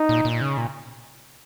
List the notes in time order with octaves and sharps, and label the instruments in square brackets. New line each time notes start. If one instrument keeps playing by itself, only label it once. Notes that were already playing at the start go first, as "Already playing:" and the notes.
Already playing: [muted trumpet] D#4
[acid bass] A#2
A#2
C#3
A#2